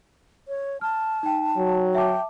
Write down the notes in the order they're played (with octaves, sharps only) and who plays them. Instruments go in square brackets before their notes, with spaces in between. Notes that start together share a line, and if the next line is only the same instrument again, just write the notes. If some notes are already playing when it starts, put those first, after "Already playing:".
[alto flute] C#5
[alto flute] A5 [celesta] F6
[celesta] D#4 G5
[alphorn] F#3
[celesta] E5 A5 D6 [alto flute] G5